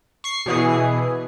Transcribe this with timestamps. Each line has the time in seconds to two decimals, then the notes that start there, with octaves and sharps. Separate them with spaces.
0.24 C#6 C7
0.46 B2 E3 G#4